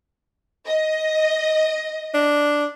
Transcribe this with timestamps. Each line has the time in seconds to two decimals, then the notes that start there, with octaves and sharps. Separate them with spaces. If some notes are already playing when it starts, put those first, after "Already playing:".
0.66 D#5
2.14 D4